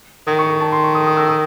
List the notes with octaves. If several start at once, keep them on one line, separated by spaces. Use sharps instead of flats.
D#3 D#6
C#6
C#6
A5
C6
C#6
D#6
D#6
E6
D#6